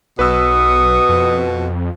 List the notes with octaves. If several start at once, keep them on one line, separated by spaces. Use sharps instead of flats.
B1 B2 B4 C#6 D#6 E6
F2